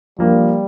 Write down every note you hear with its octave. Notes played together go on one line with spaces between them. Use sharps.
F3 G3 A#3 D4